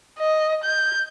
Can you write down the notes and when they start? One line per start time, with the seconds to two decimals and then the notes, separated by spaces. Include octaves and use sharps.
0.19 D#5
0.64 G6